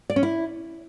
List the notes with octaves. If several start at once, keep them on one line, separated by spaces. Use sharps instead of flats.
D5
C#4
E4